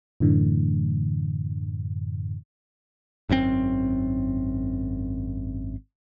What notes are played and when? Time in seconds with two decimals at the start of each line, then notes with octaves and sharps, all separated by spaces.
0.20 F#2 A2 D3 E3
3.29 G#1 F#2 D#3 C4